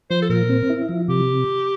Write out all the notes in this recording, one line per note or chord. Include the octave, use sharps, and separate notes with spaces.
F3 C5
A4
A#2 A#4
C4
E4
F3
C3 G4